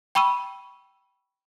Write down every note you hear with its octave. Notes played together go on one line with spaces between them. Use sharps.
G5 B5 C#6 E6 D#7